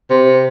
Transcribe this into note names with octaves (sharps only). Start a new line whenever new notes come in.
C3